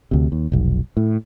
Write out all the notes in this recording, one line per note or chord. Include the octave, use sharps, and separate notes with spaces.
D2 C3
D#2
F1 B1
A2